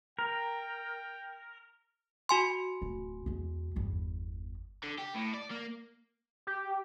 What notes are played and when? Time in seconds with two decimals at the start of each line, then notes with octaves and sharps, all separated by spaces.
0.19 A#4 G5
2.29 F#4 G#5 C6
2.82 D1
3.26 E2 G#3
3.76 G1 E2
4.83 D3
4.98 G4
5.14 A2
5.34 D5
5.51 A#3
6.47 G4